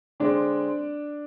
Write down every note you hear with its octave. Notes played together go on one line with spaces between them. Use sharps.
D3 G#3 C4 D4 D5